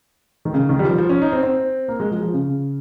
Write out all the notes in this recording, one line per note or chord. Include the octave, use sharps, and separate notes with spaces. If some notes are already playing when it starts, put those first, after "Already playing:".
D#3
C#3
D#3
G3
F3
F3
C#4
D#4
C4
C4
A#3
G#3
F3
F3
C#3